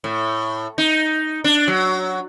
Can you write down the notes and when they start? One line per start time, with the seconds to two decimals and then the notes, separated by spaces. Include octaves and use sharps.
0.04 A2
0.78 D#4
1.44 D4
1.68 F#3